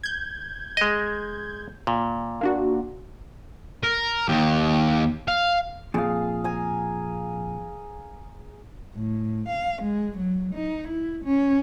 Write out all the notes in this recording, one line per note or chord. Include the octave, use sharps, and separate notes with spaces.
G6 G#6
G#3 D#5
A#2
A#3 D4 F#4
A#4
D#2 G4
F5
F2 A#2 G#4 F5
G#5 A#5
A2
F5
G#3
F#3
D#4
E4
C#4